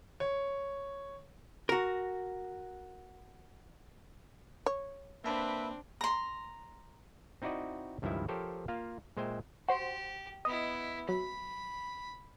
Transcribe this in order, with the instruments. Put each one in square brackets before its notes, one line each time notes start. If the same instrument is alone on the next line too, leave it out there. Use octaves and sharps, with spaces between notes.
[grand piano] C#5
[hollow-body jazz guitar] F#4 A#4
[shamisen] C#5
[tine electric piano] A#3 A5 B5 [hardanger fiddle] C4 D4 [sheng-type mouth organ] B4 E5
[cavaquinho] A#5 C6
[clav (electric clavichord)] C4 D#4 E4 F#4 D5 D#5
C#2 G2 D#3 F3 E4 E5
F3 G4 A4 A#4 C5 C#5
A#3 F4 F5
A#2 G#3 C5 E5 G5
[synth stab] F#4 C5 [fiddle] G4
[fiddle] B3 E4 [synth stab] D#5
[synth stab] F#3 [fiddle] B5